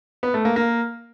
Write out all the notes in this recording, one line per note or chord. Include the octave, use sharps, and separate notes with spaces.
B3
A3
A#3
A#3